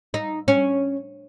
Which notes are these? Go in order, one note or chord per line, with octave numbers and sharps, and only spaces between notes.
D#4
C#4